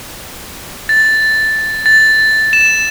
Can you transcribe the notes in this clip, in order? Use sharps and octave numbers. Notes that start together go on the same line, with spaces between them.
A6
A6
E7